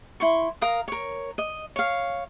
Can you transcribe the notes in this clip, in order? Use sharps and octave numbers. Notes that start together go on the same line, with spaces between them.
E4 C6 C#6
A#4 F5 A#5 D#6
A#4 C#5
D#5
C#5 F5